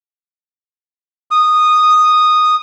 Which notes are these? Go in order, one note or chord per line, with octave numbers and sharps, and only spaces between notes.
D#6